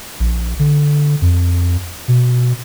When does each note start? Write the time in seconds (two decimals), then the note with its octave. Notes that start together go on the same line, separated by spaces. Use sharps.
0.20 A#1
0.59 D3
1.21 F2
2.08 B2